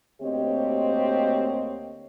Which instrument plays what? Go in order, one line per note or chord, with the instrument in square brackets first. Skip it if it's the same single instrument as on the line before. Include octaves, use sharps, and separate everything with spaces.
[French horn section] D2 A#3 C4 G4 C#5 D#5